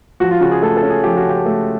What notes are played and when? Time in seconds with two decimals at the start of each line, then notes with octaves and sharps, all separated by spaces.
0.20 F3 F#4
0.31 F4
0.41 C#3 F#4
0.51 G#4
0.62 A3 A4
0.77 A4
0.83 C#4
0.90 G#4
1.04 F3 G4
1.17 F#4
1.25 C#3 G4
1.46 A3